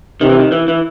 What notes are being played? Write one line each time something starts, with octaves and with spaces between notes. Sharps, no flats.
C3 D#3
E3
D#3
E3
E3